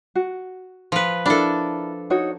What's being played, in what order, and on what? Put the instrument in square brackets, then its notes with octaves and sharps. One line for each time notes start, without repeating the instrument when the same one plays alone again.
[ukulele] F#4
[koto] F3 B4
[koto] D4 A4 [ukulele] E4 A#4 B5
[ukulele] D#4 F#4 C#5